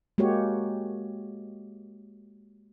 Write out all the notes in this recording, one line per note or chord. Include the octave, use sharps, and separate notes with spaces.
G#3 A#3 F#4 G4 C#5